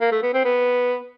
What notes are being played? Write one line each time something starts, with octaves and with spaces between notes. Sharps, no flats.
A#3
A3
B3
C4
B3